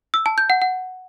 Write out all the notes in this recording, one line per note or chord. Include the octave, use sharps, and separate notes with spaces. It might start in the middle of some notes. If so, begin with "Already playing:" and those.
E6
A5
G6
F#5
F#5